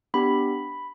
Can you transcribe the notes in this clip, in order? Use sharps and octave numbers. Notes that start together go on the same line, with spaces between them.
B3 D4 G4 B5